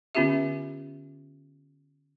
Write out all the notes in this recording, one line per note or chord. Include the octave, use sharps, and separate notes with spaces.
D3 B3 C#4 F4 G4 E5